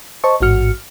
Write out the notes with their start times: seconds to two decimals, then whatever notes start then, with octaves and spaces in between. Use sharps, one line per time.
0.24 C5 D#5 A5 C#6
0.41 A1 G#2 F#4 F6 C#7